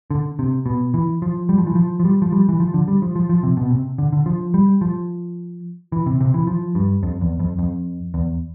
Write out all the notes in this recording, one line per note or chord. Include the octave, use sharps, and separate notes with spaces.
D3
C3
B2
E3
F3
G3
F3
E3
F3
F3
G3
F3
G3
E3
F3
D3
G3
F3
F3
F3
C3
B2
C3
D3
D3
F3
G3
F3
E3
C3
C3
E3
F3
G2
F2
E2
F2
F2
E2